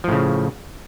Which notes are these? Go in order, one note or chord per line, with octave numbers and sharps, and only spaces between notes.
A2 C#3 F3